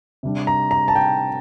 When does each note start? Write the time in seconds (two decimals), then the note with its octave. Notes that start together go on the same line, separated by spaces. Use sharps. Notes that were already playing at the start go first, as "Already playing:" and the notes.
0.23 C3 G3 D4
0.47 A#5
0.71 A#5
0.88 A5
0.95 G5